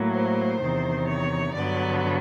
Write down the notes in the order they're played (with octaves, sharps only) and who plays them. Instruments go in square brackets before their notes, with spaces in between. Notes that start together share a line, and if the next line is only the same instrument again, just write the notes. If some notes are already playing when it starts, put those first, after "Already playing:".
Already playing: [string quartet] A2 F#3 A#3
C5
E2 C3 D#3
C#5
G2 D3 F#3 B3 D5